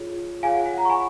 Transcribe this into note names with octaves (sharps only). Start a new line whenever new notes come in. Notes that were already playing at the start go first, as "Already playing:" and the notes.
Already playing: F4 G#4 C#5
F4 G#4 C#5 F5 G#5
F#5
F#5
F#5 A#5
C#6
G#5 B5